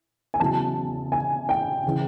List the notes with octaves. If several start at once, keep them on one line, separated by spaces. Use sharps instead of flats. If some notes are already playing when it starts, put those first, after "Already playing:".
G#5
E2 C#3 F#3 A5
G#5
G5
C#3 E3